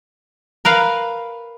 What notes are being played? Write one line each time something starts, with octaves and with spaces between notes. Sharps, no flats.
A#4 B4 F5